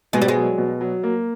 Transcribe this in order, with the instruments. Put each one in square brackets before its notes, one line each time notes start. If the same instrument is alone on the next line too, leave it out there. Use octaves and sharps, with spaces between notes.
[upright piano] B2 [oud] G#3
[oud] G3
G#3
[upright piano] F#3
B2
F#3
A#3